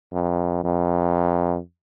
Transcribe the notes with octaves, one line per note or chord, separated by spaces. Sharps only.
F2
F2